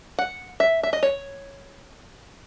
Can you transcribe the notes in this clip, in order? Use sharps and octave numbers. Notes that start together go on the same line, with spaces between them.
F#5
E5
E5
D#5
C#5